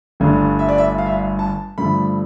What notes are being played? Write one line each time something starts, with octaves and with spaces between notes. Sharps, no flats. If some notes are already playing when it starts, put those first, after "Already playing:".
G1 G2 D3 A3
E5
D5
E5
F5
E5
F5
A5
G2 D3 F3 A3 B5